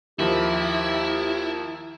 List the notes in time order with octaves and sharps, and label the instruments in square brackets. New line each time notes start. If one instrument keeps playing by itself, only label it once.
[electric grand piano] D#2 D#3 F3 [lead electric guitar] E4 [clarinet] G4